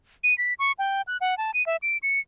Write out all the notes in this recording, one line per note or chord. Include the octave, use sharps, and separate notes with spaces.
D#7
B6
C#6
G5
F#6
F#5
A5
D#7
E5
D7
C#7